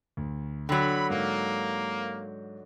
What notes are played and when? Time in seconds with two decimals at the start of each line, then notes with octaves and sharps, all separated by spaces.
0.17 D2
0.69 D3 F#3 G5 B5
1.10 G#2 A#3